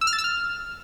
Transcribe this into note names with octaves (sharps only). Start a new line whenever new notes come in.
E6
F6
A6
E6
F6